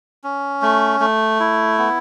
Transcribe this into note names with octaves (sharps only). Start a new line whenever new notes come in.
C#4
A3
A3
E4
B3